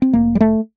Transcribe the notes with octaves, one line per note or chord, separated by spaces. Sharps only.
C4
F1 A#3
G3
A3